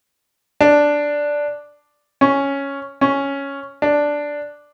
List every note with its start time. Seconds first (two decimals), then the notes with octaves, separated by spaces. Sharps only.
0.61 D4
2.21 C#4
3.01 C#4
3.82 D4